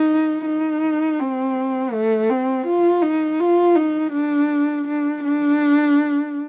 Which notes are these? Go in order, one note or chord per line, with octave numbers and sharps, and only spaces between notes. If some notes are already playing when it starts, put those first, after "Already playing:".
Already playing: D#4
D#4
C4
A3
C4
F4
D#4
F4
D#4
D4
D4
D4